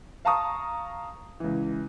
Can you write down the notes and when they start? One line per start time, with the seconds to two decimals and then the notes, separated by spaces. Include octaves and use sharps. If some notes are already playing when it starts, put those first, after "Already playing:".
0.25 F5 A5 A#5 C#6 D#6
1.40 C#2 E3